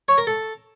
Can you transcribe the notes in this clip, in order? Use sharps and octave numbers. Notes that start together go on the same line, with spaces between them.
C#5
A#4
A4